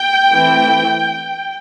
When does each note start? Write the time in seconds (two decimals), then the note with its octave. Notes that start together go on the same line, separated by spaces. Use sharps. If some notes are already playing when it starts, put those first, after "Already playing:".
Already playing: G5
0.30 E3 A3 C4 E4